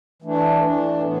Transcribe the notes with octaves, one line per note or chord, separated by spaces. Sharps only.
E3 A3 D4
E3 A3 D4
A2 E3 B3